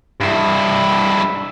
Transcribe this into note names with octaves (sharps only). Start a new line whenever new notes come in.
G2 E4